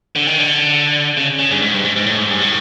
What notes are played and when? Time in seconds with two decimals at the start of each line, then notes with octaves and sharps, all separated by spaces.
0.16 D3
0.27 D#3
0.38 D3
1.17 C#3
1.39 C#3
1.51 G2
1.62 G#2
1.74 G2
1.85 G#2
1.96 G#2
2.06 A2
2.18 G#2
2.30 G2
2.41 A2